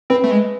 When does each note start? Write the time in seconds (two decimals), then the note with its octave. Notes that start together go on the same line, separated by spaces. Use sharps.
0.10 C4 B4
0.24 A3
0.31 G#3